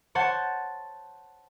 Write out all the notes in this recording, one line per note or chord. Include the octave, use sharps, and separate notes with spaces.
C5 C#5 F#5 A5